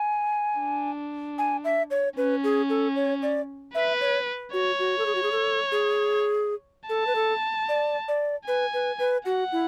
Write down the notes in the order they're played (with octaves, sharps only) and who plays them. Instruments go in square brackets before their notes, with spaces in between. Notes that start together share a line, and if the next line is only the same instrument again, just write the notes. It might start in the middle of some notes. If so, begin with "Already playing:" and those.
Already playing: [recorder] G#5
[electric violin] D4
[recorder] G#5
E5
C#5
[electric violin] C#4 [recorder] B4
[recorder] G#4
A4
C#5
D5
[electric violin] B4 [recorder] E5
[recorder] C#5
[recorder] F#4 [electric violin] C#5
[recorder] F#4
A4
G#4
F#4
G#4
A4
G#4
[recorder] A4 [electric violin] A5
[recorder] B4
A4
D5
D5
[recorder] B4 [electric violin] G#5
[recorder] B4
B4
[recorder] F#4 [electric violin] F#5
[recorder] E4